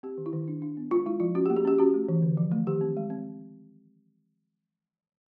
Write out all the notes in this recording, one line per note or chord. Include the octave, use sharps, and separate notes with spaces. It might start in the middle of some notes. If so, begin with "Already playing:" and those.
C4 G4
D#3
E4
D#3
D4
D4
B3
G#3 F4
G#3 E4
F3 F4
C#4 F#4
G4
A#3
G#4
C#4 G4
C#4 F#4
A3
E3
D3
F3
A3
D#3 G4
C4
G#3
C4